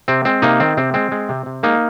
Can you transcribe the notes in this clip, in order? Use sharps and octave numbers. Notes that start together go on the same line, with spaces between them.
C3 C4
G#3 C4
C3 A#3 D#4
D#3 C4
C3 C4
G#3 C4
G#3
C3
C3
G#3 A#3 D#4